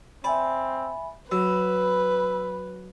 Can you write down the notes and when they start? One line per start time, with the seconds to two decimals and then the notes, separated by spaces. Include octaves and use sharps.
0.24 C4 D5 E5 G#5 B5
1.31 F#3 B4 B5 E6